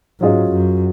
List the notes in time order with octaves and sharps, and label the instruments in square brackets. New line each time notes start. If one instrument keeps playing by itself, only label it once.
[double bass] G#2 [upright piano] F#3 C#4 F4 G#4 D#5
[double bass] F#2